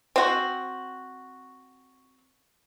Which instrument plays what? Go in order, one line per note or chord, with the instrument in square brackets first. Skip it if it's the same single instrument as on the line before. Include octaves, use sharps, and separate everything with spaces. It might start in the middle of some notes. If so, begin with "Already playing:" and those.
[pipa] C4 F#4